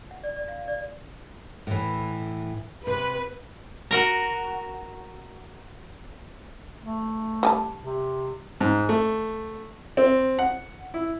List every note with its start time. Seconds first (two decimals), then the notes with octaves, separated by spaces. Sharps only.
0.11 F#5
0.23 D5
0.36 D5
0.48 F5
0.68 D5
1.67 A2 E3
2.87 C3 B4
3.91 F#4 A#4 A#5
6.82 A3
7.43 G3 G#5 A5
7.81 C3
8.61 G#2
8.89 A3
9.97 C4
10.38 F#5
10.94 E4